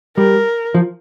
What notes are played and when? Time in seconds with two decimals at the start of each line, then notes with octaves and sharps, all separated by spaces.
0.17 G3 A#4
0.74 F3